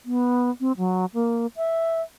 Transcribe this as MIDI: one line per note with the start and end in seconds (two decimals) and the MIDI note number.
0.05 0.50 59
0.60 0.72 60
0.78 1.06 54
1.14 1.47 58
1.56 2.01 76